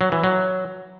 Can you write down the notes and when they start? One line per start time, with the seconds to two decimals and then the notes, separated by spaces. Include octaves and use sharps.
0.01 F#3
0.12 E3
0.24 F#3